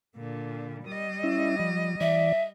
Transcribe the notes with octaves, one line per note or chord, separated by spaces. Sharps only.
A#2 D3
G3 D#5
C#4 E4 E5
F3
E3 D5 E5